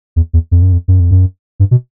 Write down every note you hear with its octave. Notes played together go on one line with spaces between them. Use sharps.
E2
E2
F2
F#2
F2
F#2
F2
F#2
G2
B2